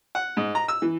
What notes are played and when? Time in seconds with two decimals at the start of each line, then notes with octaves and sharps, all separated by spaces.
0.15 F#5
0.37 G#2
0.55 A#5
0.68 E6
0.82 E3